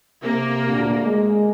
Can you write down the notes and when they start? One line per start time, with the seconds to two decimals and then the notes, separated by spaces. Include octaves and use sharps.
0.23 C3 A#3
0.67 D2 A#2
1.04 G#3